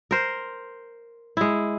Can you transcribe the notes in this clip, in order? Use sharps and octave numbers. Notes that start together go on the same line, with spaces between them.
A#4 C5
G#3 E4